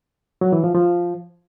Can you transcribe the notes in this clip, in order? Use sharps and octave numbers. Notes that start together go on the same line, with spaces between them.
F#3
E3
F3
F3